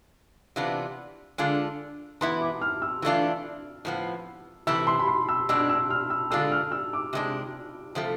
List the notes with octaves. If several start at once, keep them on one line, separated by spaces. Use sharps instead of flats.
C3 E3 B3 D4 F4
D3 G#3 D4 F4
E3 B3 E4 C6
D6
F6
E6
E3 A3 D4 F4
A2 F3 B3
C3 E3 A3 E4 E6
C6
B5
C6
E6
B2 G#3 D4 E6
E6
F6
E6
D3 G#3 D4 F4 E6
F6
E6
D6
C3 G#3 D4
C3 F3 A3